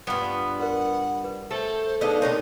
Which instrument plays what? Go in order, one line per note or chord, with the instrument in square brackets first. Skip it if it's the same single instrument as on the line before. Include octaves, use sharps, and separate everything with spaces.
[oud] G2 F4 [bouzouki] B3
[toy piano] A#4 B4 [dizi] F#5
[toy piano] B4
[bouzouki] A3 A4 [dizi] C5
[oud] D3 B3 D#5 [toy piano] D#4 G#4 E6 [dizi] F5
[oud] C3 D4 D#4 [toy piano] A#4 C#5 C#6 [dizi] D#5